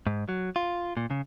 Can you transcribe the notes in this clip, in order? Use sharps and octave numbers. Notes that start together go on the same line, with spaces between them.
G#2
F#3
F4
A#2
C#3